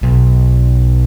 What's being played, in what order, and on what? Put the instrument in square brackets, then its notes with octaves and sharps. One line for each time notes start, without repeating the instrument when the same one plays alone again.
[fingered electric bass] B1